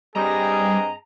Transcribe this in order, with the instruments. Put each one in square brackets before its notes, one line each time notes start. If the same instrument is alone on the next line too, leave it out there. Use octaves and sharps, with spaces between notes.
[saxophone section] G2 C4 D#5 [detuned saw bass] G3 [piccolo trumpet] G#4 [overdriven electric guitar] A#5